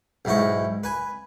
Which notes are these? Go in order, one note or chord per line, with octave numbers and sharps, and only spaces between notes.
B1 G#2 E4 C#6
B4 G#5